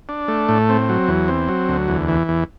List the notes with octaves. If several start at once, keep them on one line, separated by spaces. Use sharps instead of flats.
D4
A3
A2
C4
F#3
E2
C4
F#3
D2
E2
E3
E2